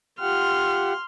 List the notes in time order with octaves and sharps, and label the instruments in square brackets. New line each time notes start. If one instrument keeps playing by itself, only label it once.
[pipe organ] F4 G4 F#5 [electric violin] C6 F6